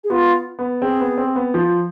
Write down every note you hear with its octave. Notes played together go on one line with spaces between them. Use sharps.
G#4
B3 F4
B3
C4 G#4
B3
C4
B3
F3